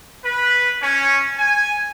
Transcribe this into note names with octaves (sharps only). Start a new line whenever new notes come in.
B4
C#4
G#5